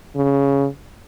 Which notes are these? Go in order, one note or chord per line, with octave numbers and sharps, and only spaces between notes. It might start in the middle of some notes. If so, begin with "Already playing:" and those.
C#3